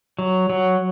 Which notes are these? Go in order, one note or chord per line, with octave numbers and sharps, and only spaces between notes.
F#3
F#3